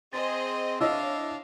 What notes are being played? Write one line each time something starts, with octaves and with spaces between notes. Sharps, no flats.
C4 G#4 C5 D#5 A6
D4 E4 C#5 D#5 F5 E6